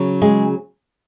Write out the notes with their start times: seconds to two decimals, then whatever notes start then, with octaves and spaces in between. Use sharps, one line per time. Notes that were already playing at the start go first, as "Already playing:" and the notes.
Already playing: C#3 F#3
0.22 G#3 G#4